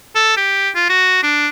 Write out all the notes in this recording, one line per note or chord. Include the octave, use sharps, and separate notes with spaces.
A4
G4
F4
F#4
D4